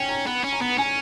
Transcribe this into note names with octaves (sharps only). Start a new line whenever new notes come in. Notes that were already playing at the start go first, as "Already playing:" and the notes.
Already playing: C#4 G5
A#5
B3 B5
C#4
A#5
B3
C#4 G#5